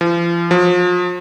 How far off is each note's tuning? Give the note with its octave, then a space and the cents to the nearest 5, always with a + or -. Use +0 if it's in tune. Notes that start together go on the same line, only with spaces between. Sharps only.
F3 -40
F3 +35